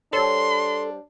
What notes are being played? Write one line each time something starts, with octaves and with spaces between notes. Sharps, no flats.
G3 D4 A4 C5 C#5 C6